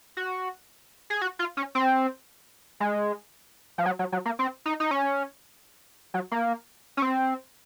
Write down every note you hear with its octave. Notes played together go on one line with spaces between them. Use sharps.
F#4
G#4
F#4
F4
C#4
C4
G#3
F3
F#3
F#3
F#3
A#3
C4
D#4
D#4
C#4
F#3
A#3
C#4
C4